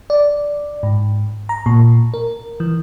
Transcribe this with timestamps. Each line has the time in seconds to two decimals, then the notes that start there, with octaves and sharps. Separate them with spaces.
0.10 D5
0.83 G#2
1.49 A#5
1.66 A#2
2.14 A#4
2.60 E3